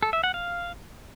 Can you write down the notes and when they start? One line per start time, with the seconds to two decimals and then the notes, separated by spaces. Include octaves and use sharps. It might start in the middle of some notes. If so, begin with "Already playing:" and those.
0.03 A4
0.13 E5
0.24 F#5
0.34 F5